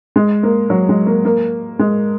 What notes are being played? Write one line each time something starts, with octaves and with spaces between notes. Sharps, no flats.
G#3
A#3
F#3
G#3
A#3
A#3
G#3